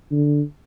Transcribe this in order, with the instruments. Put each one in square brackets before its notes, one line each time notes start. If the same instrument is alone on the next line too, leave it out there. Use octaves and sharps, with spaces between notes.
[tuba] D3